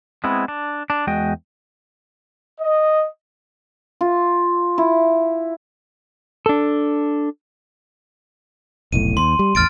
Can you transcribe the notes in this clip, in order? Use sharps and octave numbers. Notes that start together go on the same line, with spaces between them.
G#3 B3 C4 E4
D4
D4
E2 G#3 F#4 D#5 G5
D#5
F4
E4
D4 A4
F1 B1 A2 D#7
D#2 C6
G3
A1 E2 F6 A6 D7